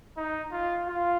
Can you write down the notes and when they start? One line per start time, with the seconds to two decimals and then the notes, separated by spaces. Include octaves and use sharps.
0.17 D#4
0.52 F4
0.88 F4